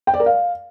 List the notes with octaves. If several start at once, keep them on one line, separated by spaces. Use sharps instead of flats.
G5
D5
A#4
F5